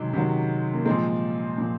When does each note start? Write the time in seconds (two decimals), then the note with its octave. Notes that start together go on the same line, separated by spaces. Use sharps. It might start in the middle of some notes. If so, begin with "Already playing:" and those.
Already playing: C3 D#3 F#3 G#3
0.13 C3 D#3 F#3
0.74 A#3
0.85 A#2 F3 G#3 C4
1.58 A#2 F3